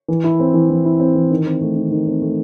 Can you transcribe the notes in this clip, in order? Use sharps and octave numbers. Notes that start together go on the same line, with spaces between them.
E3
E4
C4
E3
E3
E4
C4
E3
D#3
C4
A3
D#3
D#3
C4
A3